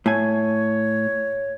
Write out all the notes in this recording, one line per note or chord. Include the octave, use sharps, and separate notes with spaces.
A2 C#5 G#5